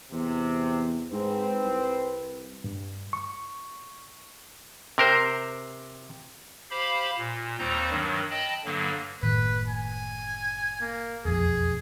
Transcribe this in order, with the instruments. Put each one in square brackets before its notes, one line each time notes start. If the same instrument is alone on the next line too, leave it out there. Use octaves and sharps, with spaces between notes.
[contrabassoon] E2 [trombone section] C3
[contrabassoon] G#2 [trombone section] C4 [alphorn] B4
[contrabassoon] C2
[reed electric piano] G2
C#6
[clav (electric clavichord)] C3 A#4 C5
[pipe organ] G4 C5 F5 B5
A#2
D#2 G3 C4 D#4 C5 A#5
G2 D#3 F#3
D#5 G5 A5 B5
G2 D3 F#3 A#3
[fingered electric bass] F#1 A2 D#3 [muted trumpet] B4
[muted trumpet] G#5
A#3
[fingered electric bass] E1 B1 F2 [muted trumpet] G#4